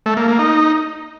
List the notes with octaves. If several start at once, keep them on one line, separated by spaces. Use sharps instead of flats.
A3
A#3
A#3
D#4